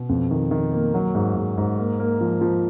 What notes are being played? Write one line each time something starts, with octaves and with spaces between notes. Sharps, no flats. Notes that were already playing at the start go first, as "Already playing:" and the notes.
Already playing: B2
F2
D#3
D#3
A#3
F#3
G#2
G#2
G#2
A#3
A#3
F3
F3